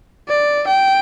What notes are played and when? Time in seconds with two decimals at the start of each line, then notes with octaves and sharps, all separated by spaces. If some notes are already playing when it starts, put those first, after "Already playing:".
0.28 D5
0.67 G5